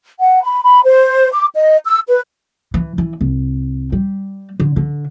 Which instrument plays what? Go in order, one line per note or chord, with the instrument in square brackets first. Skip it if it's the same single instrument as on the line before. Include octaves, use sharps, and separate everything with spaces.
[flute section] F#5
B5
B5
C5
D6
D#5
E6
B4
[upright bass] E3
E3
C2
G3
D3
D3